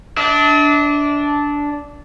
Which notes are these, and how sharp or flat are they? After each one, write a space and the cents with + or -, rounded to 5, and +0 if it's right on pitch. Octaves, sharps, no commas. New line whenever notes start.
D4 -10 E5 -45